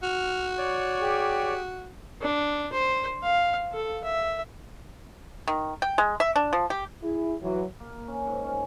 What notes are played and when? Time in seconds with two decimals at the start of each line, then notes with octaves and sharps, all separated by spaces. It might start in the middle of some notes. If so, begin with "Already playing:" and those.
0.03 F#4 F6
0.58 C#5 D5
0.99 G4 G#4
2.22 D4
2.73 C5
3.23 F5
3.72 A4
4.05 E5
5.48 D#3
5.82 G5
5.98 G#3
6.20 E5
6.36 D4
6.53 F3
6.70 G4
7.03 E4 G#4
7.42 E3 F#3
7.80 A#3
8.07 C#4
8.27 G#2
8.44 C#4